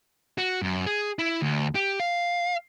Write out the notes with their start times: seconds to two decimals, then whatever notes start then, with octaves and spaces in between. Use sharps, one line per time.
0.38 F#4
0.62 F#2
0.86 G#4
1.19 E4
1.41 D2
1.75 G4
2.00 F5